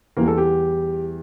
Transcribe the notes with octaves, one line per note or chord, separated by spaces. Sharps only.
E2 E3 G3 A#3 A#4
A4
G4